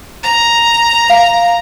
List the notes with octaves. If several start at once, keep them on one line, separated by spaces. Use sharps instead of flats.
A#5
F5